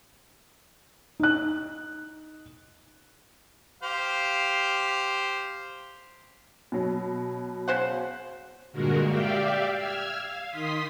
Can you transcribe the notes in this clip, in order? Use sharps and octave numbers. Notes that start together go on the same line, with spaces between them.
D#4 F#6
G4 C5 F5
B2 F#3
C#3 C5 F#5
G2 A#2 D3 G#3 F#4 A#4
G4 D5 E5 F5 G5
E6 F6 G#6
F5
D#3 C6 D#6 B6